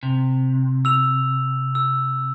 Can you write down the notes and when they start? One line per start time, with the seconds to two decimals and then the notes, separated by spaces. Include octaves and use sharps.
0.03 C3
0.85 E6 F7
1.75 E6